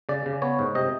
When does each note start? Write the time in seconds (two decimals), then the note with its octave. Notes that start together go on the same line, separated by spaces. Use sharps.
0.09 C#3 D5
0.26 C#3
0.42 B3 C#5
0.59 G#2
0.75 C3 D#5